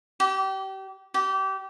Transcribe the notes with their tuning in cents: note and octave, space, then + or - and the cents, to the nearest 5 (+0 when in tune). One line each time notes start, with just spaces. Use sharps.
G4 -30
G4 -25